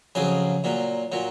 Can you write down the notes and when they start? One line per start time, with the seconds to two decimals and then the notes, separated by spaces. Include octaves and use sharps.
0.15 F2 C#3 F#3 G#4
0.64 A#2 F#3
1.12 A#2 F#3